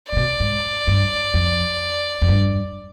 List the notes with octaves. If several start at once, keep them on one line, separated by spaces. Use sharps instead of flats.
C3 D5
B2
G#2
G2
F2
F2
G2